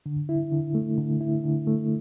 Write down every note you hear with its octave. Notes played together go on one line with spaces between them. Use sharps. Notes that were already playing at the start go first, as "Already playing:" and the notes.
D3
E4
D3
A3
D3
E4
D3
A3